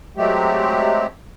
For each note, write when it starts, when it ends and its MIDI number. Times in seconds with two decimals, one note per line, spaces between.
0.17 1.07 54
0.17 1.07 56
0.17 1.07 57
0.17 1.07 60
0.17 1.07 67